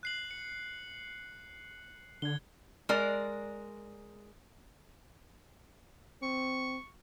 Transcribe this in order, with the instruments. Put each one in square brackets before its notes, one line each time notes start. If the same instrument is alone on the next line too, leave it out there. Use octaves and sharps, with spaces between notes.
[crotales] F#6 C7 F#7
C#7
[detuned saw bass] D3 [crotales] G#6 G7
[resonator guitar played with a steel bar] G#3 A#4 D5
[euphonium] C4 [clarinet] C#6